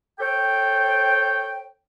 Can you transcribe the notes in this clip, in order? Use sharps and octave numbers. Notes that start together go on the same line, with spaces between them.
A4 C5 C#5 G5